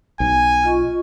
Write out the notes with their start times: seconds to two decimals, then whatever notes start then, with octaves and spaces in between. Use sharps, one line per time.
0.20 B1 G#5
0.64 F4 D#5 C#6